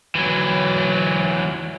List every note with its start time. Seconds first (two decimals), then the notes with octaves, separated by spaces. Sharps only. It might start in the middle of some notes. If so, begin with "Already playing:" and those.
0.15 E3 F#3